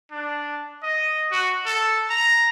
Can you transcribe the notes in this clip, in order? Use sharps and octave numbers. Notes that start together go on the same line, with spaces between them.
D4
D#5
F#4
A4
A#5